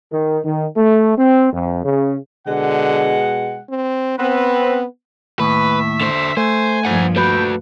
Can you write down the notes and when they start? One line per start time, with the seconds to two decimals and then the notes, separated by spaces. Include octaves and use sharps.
0.12 D#3
0.45 D#3
0.76 A3
1.18 C4
1.53 F2
1.84 C#3
2.47 B2 D3 G#3 F#5
3.70 C4
4.19 B3 C4 B4
5.40 D#2 A2 B4 E5
6.01 D3 C5
6.37 A3 C5 G#5
6.85 G2 A#2 F3 C5 F#5
7.16 A3 F#4 B4 G5